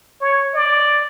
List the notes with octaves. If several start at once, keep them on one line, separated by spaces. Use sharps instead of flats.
C#5
D5